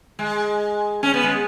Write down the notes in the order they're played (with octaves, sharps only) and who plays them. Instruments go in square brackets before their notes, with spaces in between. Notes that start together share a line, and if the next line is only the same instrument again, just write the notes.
[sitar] G#3
C#4
B3
G#3